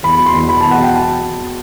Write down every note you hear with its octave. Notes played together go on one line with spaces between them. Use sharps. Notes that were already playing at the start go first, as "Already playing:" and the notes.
E2 B5
F#3
C6
E2
B2 B5
A5
E2
F#5
F#3 G5
A5